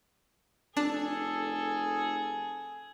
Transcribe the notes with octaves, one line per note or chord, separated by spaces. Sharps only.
F1 D4 G#4 A4